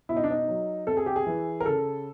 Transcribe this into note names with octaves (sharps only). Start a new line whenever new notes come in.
B2 E4
D#4
D4
D#4
F#3
C3 A4
G#4
G4
G#4
E3
A#4
C#3 A4